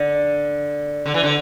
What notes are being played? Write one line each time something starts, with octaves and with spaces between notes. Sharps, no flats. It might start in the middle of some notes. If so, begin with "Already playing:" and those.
Already playing: D3
D3
E3
D3